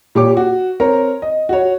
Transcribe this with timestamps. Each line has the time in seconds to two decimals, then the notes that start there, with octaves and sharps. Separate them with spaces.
0.15 A#2 G4 C#5 D6
0.37 F#4
0.80 C4 A#4 C#5 A#5
1.22 D#5
1.49 F#4 C#5